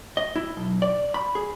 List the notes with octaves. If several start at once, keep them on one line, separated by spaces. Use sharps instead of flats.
D#5
E4
B1
D5
B5
G#4